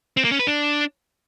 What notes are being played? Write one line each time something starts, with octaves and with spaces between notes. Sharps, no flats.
C4
A#3
C#4
B4
D4